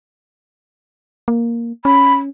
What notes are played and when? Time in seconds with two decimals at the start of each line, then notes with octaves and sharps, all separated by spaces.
1.28 A#3
1.85 C#4 B5